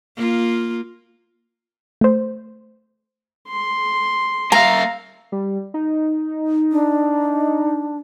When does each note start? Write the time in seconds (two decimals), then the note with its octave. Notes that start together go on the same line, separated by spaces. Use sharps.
0.16 A#3 F4
2.01 A3 C5
3.49 C6
4.52 A#3 E5 F5 A#5
5.32 G3
5.74 D#4
6.72 D4